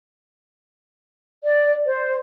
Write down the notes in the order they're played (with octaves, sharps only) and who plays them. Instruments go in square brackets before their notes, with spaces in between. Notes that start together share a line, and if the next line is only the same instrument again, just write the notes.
[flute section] D5
C5